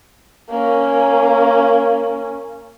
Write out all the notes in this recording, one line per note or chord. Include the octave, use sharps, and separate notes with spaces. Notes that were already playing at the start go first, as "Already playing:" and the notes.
A#3 C#4